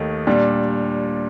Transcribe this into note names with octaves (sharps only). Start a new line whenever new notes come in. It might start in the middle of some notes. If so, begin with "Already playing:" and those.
Already playing: D#2 D#3 A3
A#2 G3 D4